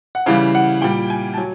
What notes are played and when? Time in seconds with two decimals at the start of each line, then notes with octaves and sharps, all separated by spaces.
0.15 F#5
0.26 C#3 E3 G3 F5
0.55 F#5
0.82 A#2 G3 G5
1.10 G#5
1.33 A5
1.37 F#3 G#5